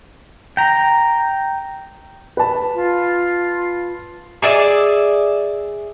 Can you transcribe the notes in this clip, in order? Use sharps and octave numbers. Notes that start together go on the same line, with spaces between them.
G5 A#5
B4 A5
F4
G#4 D5 E5